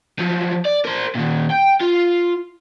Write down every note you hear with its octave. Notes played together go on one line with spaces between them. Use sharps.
F3 F#3
D5
A#4 C5
A#2 D#3
G5
F4